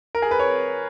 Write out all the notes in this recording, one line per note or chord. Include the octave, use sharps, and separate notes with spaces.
A#4
G#4
B4
C#5